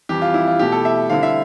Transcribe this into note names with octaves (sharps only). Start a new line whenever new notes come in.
F2 E3 G3 G4
F4
E4
F4
B2 A3 E4 G4
A4
E5
D3 G3 C4 E4 F5
E5